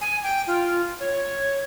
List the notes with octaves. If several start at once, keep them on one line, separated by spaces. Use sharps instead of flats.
G#5
G5
F4
C#5